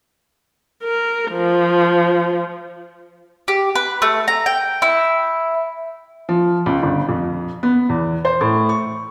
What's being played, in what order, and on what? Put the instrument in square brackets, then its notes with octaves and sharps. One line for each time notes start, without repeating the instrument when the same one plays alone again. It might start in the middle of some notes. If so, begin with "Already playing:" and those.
[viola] A#4
F3
[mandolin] G4
B4
A3
A#5
G5
E4
[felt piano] F3
C#2
G1
F2
B3
E2
C5
A2
C#6